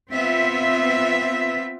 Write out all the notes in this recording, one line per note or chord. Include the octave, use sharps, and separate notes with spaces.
B3 C4 F4 E5